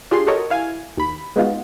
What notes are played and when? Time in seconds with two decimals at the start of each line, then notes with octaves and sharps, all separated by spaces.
0.11 D4 F4 G4 G#4 C6
0.27 F#4 G4 A4 A#4 C#5 D#5
0.50 E4 F5 G#5
0.97 D#2 B5
1.36 G#3 B3 D#4 F4 F#4